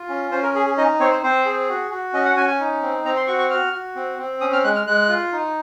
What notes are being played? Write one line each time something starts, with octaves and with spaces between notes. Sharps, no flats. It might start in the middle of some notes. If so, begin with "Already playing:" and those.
Already playing: F4
C#4
C#4 C5
A#4
G#4
G#4
D#4 D#5
C4 C#5
C5
C4 C5
G#4
F#4
F#4
C#4 D#5
F#5
C#4 G#5
G#5
D#4
C4
C4 A#5
C6
F#4 C#6
C#6
F#4 F6
F#4
C4
C4
C#4 D#6
F6
G#3 F#6
F6
G#3 F#6
F4
D#4